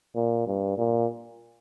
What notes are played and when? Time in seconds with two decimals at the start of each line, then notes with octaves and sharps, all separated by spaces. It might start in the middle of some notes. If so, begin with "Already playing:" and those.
0.15 A#2
0.47 G2
0.78 A#2